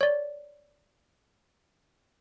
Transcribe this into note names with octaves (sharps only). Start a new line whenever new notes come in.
C#5 D5